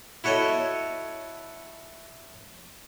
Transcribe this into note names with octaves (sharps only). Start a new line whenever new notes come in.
E4 F#4 A4 C#5 D#5